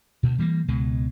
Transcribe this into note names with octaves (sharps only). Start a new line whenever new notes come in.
D2 B2
E3 G3 A3 A#3
C#2 B2 G#3